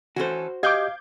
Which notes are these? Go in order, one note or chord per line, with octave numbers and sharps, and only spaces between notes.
E3 C#4 F#4 A4 C5
G4 D#5 F5 D6 G6 G#6